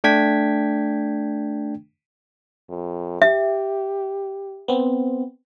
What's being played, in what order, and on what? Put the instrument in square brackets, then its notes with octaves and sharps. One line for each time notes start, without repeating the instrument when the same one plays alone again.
[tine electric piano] A3 D4 G5 G#6 B6
[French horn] F2
[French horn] G4 [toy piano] E5
[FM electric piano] B3 C4